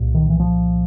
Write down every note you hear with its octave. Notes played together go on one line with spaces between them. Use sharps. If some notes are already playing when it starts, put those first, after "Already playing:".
Already playing: C2 A#2
D#3
E3
F3